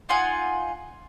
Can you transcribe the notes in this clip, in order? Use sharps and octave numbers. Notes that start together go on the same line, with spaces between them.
D#4 F4 F#5 G#5